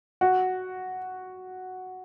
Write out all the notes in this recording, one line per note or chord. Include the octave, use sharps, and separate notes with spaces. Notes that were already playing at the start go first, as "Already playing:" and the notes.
F#4